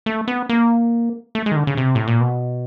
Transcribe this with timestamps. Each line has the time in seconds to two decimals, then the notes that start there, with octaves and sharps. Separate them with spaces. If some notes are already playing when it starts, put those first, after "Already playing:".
0.06 A3
0.28 B3
0.49 A#3
1.35 A3
1.46 G#3
1.52 D#3
1.56 D3
1.67 C#3
1.77 C3
1.95 A2
2.08 A#2
2.21 B2